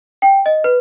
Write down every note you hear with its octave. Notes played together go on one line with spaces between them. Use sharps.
G5
D#5
B4